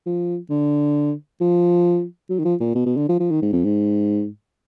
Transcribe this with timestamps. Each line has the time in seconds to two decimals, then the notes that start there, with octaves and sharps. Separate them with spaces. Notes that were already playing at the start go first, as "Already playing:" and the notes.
0.06 F3
0.50 D3
1.41 F3
2.30 F#3
2.39 D#3
2.45 F3
2.60 A#2
2.75 B2
2.86 B2
2.97 D3
3.09 F3
3.20 F3
3.31 D#3
3.42 G#2
3.53 F2
3.64 G#2